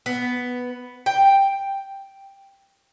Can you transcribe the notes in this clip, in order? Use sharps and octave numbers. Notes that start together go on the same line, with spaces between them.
B3
G5